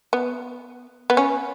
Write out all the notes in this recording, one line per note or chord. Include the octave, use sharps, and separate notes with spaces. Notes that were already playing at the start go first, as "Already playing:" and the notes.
B3
B3
C#4